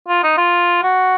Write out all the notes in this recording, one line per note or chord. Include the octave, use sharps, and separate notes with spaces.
F4
D#4
F4
F#4